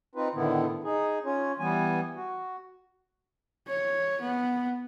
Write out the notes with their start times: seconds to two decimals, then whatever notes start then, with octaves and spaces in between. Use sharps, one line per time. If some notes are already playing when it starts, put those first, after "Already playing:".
0.15 C4 D#4 F4 B4
0.35 A2 D3 D#3 B3 E4
0.84 D#4 G#4
1.25 C#4 F4 C#5
1.59 E3 G3 B3 G#5
2.16 F#4
3.68 C#5
4.21 B3